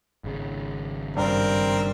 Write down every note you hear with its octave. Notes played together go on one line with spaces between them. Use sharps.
G#1 C#3
G2 C4 A#4